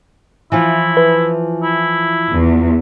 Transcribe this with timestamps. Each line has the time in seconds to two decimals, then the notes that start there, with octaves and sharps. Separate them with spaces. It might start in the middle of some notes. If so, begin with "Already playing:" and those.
0.52 E3 F3 E4 F4
0.97 B4
1.63 E4
2.32 E2